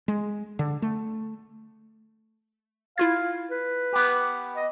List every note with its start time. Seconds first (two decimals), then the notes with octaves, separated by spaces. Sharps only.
0.08 G#3
0.59 D3
0.82 A3
2.98 E4 F4 F5 G#6
3.51 B4
3.93 B3 G4
4.56 D#5